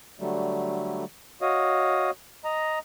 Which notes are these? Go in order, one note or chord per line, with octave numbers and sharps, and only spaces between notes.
D3 F#3 G3 A3
F#4 C#5 D#5 F5 D#6
D#5 A#5